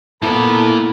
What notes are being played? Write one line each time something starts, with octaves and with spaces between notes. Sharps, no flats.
A#2 A#3 B3 E4 A4 A5 A#5